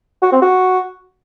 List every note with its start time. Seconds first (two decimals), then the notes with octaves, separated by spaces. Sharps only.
0.22 F#4
0.32 C4
0.42 F#4